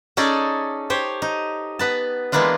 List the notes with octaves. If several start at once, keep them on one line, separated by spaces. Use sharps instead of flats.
C#4 D#4 G#4 A4 D5
G4 C5 C#5
D#4
B3 B4 A5
E3 G#3 A#3 B3 D4 F4